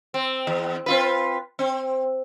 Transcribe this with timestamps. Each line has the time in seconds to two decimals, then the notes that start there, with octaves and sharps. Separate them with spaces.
0.14 C4
0.47 E2
0.86 C4 F4 B4
1.59 C4